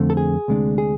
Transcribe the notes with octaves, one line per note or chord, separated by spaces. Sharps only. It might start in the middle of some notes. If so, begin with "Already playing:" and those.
Already playing: F2 D3 A3 C4
A4
G#4
D2 C3 G#3 D4
G#4